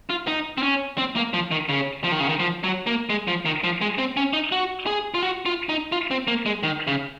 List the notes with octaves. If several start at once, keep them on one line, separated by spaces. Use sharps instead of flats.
F4
D#4
C4
C#4
C4
A#3
F3
D#3
C#3
F3
D#3
C#3
D#3
F3
F#3
A#3
G#3
F3
D#3
F3
G#3
C4
C#4
D#4
F#4
G#4
F4
F#4
F4
D#4
F4
C4
A#3
G#3
D#3
C#3